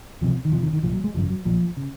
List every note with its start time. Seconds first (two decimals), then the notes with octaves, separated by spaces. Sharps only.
0.21 C#2 C3 F3
0.45 D#3
0.52 F1 F2 C3 F3
0.63 D#3
0.73 D#3
0.83 C2 A#2 F3
0.94 F#3
1.04 G#3
1.14 G#1 F#2 C#3 F3
1.30 F#3
1.45 A#1 A#2 F3
1.77 C#3